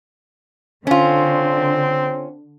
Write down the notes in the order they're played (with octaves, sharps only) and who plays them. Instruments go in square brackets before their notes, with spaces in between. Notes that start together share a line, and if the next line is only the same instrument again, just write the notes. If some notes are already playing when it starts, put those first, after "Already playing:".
[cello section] D3 [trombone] C4 [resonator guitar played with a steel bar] C#4 F4